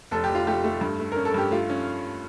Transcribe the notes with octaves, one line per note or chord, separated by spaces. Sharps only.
F1 A4
G4
F1
F4
A3 G4
A3
G2
A3
C#4 A#4
A4
G2 G4
A3 F4
C#4